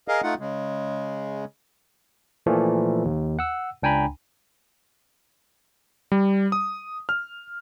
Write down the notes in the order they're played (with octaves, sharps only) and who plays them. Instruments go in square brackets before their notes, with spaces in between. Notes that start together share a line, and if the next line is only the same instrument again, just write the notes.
[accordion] G#4 A#4 D#5 F5
A3 D#4 F4 F#5
C#3 G#3
[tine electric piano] A#2 E3 F3 A3
D#2
F#5 E6
C#2 D4 G5 G#5 A#5 B5
[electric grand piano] G3
D#6
F6